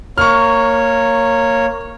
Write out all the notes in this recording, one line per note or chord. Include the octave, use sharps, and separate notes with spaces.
A#3 C#5 C#6 F6